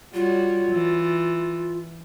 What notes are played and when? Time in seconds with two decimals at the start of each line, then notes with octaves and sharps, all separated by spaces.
0.14 G3 F4 F#4 C#5
0.72 E3